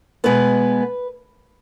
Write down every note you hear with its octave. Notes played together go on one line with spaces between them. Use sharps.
B2 G#3 B3 B4